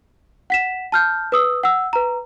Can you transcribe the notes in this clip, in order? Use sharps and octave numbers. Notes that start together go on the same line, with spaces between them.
F#5 B6 E7
A5 F6 G6
B4 D#6 E6
F#5 E6
B4 A#5